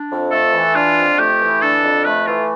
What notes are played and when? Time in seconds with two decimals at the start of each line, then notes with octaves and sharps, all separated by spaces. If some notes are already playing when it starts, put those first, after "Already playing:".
Already playing: D4
0.10 F2
0.31 A3 A4
0.53 E3
0.75 D4 F4
0.97 F2
1.19 A3 G4
1.40 E3
1.62 D4 A4
1.83 F2
2.05 A3 B4
2.27 E3 F4